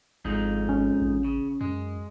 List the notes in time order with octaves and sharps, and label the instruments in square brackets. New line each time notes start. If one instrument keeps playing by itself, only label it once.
[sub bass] G#1 [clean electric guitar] F2 G#2 D#4
[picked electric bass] C#4
[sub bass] A1
[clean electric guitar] C#3
[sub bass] F#2 [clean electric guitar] G#3